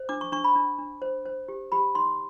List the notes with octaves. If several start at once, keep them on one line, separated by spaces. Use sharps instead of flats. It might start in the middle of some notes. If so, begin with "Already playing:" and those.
Already playing: C5
D4 D6
C#6
D4 C#6
B5
D4
D4
C5
C5
G4
G4 B5
D#4 C6